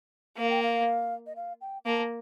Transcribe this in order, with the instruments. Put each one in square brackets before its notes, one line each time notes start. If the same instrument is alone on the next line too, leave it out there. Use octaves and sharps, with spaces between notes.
[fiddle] A#3 [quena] F5
[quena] G5
F5
D#5
F5
G5
[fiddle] A#3 [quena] A5